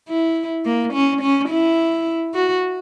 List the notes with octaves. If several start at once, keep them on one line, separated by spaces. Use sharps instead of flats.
E4
A#3
C#4
C#4
E4
F#4